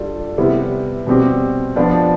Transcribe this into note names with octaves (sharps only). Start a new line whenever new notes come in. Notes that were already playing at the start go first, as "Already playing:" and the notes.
Already playing: G3 D4 F4 A4
C3 G3 B3 E4
B2 G3 C4 G4
F3 B3 D4